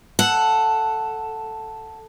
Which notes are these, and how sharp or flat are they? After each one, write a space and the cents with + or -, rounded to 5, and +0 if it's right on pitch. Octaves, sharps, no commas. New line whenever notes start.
A4 +0 F#5 +0